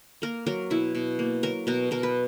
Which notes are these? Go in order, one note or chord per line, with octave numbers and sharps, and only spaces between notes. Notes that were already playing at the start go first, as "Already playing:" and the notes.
A#3 A#4
F#3 A#4
B2 E4
B2
A#3
F#3 A#4
B2 A#4
B2 A#4
B4